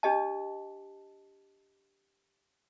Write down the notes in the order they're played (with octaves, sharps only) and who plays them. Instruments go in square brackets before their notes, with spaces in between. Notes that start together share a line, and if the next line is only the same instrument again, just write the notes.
[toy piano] D4 G4 D#5 A5